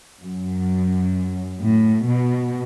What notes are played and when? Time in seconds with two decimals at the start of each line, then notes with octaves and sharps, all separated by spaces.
0.21 F#2
1.61 A2
2.07 B2